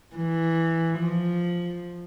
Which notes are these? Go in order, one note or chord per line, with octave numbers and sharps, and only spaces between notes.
E3
F3